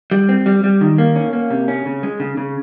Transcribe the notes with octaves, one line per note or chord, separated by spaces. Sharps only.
G3
C4
G3
G3
D#3
A#3
C#4
A#3
C3
C#4
C#3
G#3
C#3
C#3